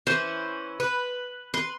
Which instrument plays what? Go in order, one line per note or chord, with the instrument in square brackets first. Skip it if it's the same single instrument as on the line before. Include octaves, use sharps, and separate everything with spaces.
[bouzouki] E3 C#4 E4 [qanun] C5
[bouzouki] B4
[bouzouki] B4 [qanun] C6